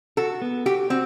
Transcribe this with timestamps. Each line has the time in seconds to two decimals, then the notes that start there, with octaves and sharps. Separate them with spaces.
0.17 F#4 A4
0.42 B3
0.66 F#4 G4
0.90 C4 F#4